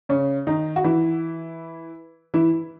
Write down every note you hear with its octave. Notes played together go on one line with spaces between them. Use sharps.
C#3 C#4
D#3 D#4
F#4
E3 E4
E3 E4